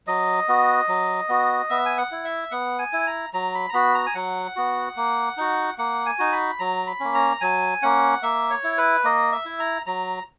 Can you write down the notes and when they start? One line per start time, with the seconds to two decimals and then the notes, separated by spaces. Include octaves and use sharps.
0.07 F#3 D#5
0.48 B3 F#4
0.88 F#3
1.29 B3 F#4
1.70 B3 E5
1.86 G#5
1.98 F#5
2.12 E4
2.24 E5
2.51 B3 F#5
2.79 G#5
2.93 E4
3.07 A#5
3.34 F#3 A#5
3.54 B5
3.69 A#5
3.74 B3 F#4 B5
3.95 A#5
4.06 G#5
4.15 F#3 F#5
4.56 B3 F#4
4.97 A#3
5.37 D#4 F#4
5.78 A#3 F#5
6.06 G#5
6.19 D#4 F#4
6.32 B5
6.59 F#3 A#5
6.87 B5
7.00 A#3 C#4
7.15 A#5
7.41 F#3 G#5
7.82 A#3 C#4 F#5
8.23 A#3 E5
8.50 C#5
8.64 E4
8.78 B4
9.04 A#3 D#5
9.32 E5
9.45 E4
9.60 A#5
9.86 F#3 A#5